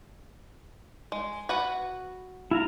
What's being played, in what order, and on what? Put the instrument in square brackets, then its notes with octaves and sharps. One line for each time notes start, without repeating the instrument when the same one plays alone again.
[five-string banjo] G#3
F#4 B4 F#5
[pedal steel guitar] E4 F4 A#5